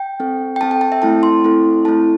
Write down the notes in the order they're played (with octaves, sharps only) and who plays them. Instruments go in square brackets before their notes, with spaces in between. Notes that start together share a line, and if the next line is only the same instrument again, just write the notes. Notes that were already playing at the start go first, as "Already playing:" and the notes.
Already playing: [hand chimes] G5
C4 A4
G5
C4 A4 A5
G5
A5
E5
A3 C4 E4 A4 A5
C6
A3 C4 E4 A4
A3 C4 E4 A4 A5